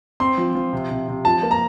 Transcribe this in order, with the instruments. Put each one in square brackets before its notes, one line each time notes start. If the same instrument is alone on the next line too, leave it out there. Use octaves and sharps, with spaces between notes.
[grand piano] C4 [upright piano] C6
[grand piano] F3
F3
C3
C3
C3
[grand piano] F3 [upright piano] A5
[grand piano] A#3
[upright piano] A#5